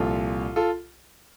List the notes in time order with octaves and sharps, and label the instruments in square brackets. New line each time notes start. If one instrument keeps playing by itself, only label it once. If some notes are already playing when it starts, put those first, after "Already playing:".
Already playing: [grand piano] C2 A#2 F3 F4 A4
F4 A4